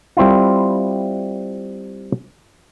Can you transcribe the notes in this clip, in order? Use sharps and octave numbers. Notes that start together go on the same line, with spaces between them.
G3 C4 E4 F4